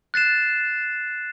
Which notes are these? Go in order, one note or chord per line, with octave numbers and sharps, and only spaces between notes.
F#6 A6 C7 E7